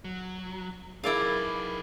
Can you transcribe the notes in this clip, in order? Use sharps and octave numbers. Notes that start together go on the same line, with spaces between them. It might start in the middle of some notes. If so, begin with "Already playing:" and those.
F#3
D#4 E4 G#4 A#4 B4 D5 F5 D6